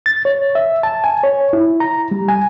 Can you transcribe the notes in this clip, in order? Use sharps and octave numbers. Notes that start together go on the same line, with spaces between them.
A6
C#5
E5
A5
G#5
C#5
E4
A#5
G3
G#5